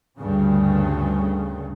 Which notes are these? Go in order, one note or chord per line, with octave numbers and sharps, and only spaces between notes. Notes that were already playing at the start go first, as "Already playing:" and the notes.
D2 G2 C#3